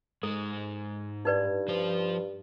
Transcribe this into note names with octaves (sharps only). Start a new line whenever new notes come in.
G#2 G#3 A4
G2 D#4 B4 D5
F3 C5